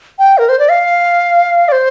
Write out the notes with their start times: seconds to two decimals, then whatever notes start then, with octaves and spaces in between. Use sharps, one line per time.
0.19 G5
0.38 A#4
0.49 C5
0.59 D5
0.70 F5
1.68 D5
1.72 C5